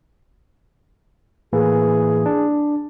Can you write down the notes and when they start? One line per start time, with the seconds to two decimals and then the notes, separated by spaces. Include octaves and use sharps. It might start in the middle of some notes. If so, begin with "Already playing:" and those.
1.53 A2 E3 A#3 G#4
2.26 D4